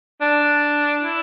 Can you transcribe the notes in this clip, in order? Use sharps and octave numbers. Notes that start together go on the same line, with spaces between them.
D4
E4